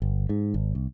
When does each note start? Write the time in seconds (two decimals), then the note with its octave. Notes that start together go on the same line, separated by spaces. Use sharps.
0.02 G1
0.29 G#2
0.54 G#1
0.75 C2